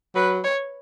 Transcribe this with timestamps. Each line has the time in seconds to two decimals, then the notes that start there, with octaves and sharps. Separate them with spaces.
0.15 F#3 B4
0.44 C#5